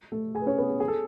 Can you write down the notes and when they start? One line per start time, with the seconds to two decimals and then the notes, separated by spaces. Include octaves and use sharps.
0.12 A3 A4
0.35 G#4 G#5
0.42 B4
0.46 C#4 C#5
0.58 B3 B4
0.69 G#4
0.80 G#4
0.88 A4